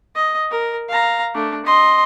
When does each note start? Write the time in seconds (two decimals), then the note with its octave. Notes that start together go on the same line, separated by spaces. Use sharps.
0.15 D#5
0.51 A#4
0.89 F5 A#5
1.35 A3 D4
1.66 D#5 C6